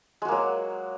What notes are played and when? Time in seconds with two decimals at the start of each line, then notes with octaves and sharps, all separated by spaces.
0.22 G#3
0.25 F#4
0.28 A#3
0.32 F#3